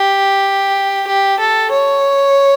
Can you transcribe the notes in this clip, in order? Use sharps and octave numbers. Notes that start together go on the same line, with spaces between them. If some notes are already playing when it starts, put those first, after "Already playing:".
Already playing: G4
G4
A4
C#5